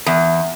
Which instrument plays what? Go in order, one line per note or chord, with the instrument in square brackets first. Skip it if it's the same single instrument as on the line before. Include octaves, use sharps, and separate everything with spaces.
[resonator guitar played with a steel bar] E2